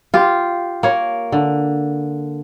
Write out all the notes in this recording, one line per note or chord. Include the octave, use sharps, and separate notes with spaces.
F4 G4
A#3 C#5
D3